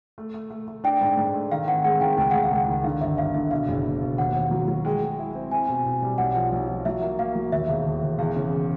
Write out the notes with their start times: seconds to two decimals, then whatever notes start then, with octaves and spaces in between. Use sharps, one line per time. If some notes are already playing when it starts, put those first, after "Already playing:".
0.18 A3
0.34 A3
0.50 A3
0.68 A3
0.84 D4 G5
1.01 G#2
1.17 G#2
1.34 A3
1.52 D#3 F5
1.68 C4 F#5
1.84 G#3 F#5
2.01 D#3 G5
2.17 C#2 G5
2.31 C#2 F#5
2.43 F5
2.51 C#2 F#5
2.68 D#3
2.84 D3 F5
3.01 G1 E5
3.18 G1 F5
3.34 D3 E5
3.51 B2 F5
3.68 F#1
3.85 F#1
4.01 B2
4.18 D#2 F#5
4.35 D#2
4.51 F#3
4.68 F#3
4.85 G#3 G5
5.02 G#3
5.19 E4
5.35 C4
5.51 E4 G#5
5.69 B2
5.85 B2
6.02 G3
6.18 B1 F#5
6.36 F3
6.52 B1
6.68 F3
6.85 F#3 E5
7.02 A#3
7.19 A#3 F5
7.36 F#3
7.52 D#2 E5
7.68 E1
7.86 E1
8.03 E1
8.19 E2 F5
8.36 C#3